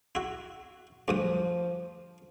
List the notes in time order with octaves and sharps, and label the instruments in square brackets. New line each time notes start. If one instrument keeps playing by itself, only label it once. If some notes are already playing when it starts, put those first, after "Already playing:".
[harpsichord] E4 F#4
[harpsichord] D2 G2 D#6 [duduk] F3